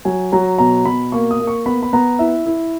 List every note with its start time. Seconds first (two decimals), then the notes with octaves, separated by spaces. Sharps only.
0.05 F#3 G#5
0.32 F#3 A#5
0.58 B2 A#5
0.85 B2 B5
1.12 A#3 C#6
1.31 D#6
1.40 A#3
1.47 C#6
1.66 B3 B5
1.83 B5
1.93 B3 A#5
2.19 E4 E5
2.46 E4